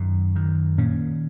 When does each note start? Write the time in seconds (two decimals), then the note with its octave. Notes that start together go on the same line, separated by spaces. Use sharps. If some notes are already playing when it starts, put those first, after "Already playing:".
Already playing: F#2 D#3
0.35 D#3
0.78 A#2 C#4